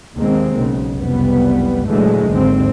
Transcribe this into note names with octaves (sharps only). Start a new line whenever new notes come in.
D#2 C3 D#3 G#3 A#3 C4
B1 C#3
F#1 C2 F2 G3 B3
A#2 D3 E3 F#3 G#3 A3
G#1 D#2 D3 C4